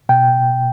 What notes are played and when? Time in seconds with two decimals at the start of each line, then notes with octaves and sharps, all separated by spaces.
0.09 B2 G5